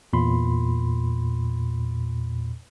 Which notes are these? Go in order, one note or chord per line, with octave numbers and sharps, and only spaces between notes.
E2 A#2 B5 C6